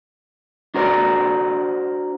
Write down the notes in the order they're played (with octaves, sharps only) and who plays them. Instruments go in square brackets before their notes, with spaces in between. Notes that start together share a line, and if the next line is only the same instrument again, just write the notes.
[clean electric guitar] D4 F#4 A#4 C5 D5